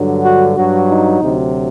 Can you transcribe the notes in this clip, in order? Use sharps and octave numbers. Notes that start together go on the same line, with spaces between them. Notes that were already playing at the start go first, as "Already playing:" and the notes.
Already playing: G2 D3 F#3
F#4
G2 F#3 F#4
D#4
D2 C3 F#3